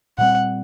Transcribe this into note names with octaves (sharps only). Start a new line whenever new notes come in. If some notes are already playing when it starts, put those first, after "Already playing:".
A#2 G3 C4 F#5